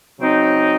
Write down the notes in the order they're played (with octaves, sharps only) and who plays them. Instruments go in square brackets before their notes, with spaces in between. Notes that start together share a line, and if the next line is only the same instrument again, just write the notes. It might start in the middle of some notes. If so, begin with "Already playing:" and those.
[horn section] C#3 F#3 C4 D#4